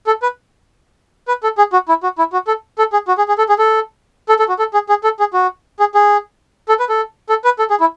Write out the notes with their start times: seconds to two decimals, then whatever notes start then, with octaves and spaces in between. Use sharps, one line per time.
0.07 A4
0.22 B4
1.28 B4
1.43 A4
1.58 G#4
1.73 F#4
1.88 E4
2.03 F#4
2.18 E4
2.33 F#4
2.47 A4
2.78 A4
2.93 G#4
3.08 F#4
3.18 G#4
3.28 G#4
3.38 A4
3.49 G#4
3.58 A4
4.29 A4
4.39 A4
4.48 F#4
4.59 A4
4.74 G#4
4.89 G#4
5.04 A4
5.19 G#4
5.33 F#4
5.80 G#4
5.95 G#4
6.69 A4
6.80 B4
6.89 A4
7.29 A4
7.44 B4
7.59 A4
7.70 G#4
7.80 E4